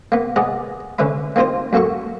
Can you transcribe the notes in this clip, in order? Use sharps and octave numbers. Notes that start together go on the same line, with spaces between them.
A#3 B3
G#4 B4 D5 D#5 F#5
D3 C#4 B4 E5 B5
A#3 C4 D#4 F4 C5
F#2 A#3 F#4 A4 C#6